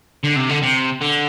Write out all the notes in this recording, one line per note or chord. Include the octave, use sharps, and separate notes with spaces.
D3
C3
D3
C3
D3